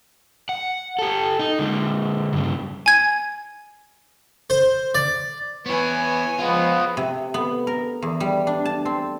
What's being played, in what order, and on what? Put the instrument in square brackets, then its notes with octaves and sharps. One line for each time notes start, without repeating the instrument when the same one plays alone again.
[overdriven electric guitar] F#5
G4 A4
D#4
D3 G#3
G2 C#3
[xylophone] G#5 G#6
[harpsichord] C5
D5
[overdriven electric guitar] B3 E4 [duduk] B4 [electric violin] C#5 G#5
[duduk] F3 [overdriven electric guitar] G#3 F4 [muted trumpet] B3
[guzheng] C3
B3
A#4
E2
G3
D4
A5
C4